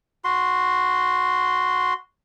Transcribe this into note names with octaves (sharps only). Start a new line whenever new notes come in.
F#4 C6